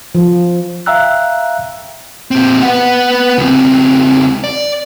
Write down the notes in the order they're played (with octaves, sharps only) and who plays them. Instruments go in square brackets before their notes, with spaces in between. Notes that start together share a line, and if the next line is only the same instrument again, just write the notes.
[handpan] F3
[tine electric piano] E5 F5 G5 A#5 E6 F#6
[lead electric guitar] A#2 C4
B3 F#5
C#2 C4
D5